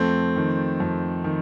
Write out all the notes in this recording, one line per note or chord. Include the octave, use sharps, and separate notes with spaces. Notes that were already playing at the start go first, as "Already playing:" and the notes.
Already playing: F2 A3 C4
D#3
F2
D#3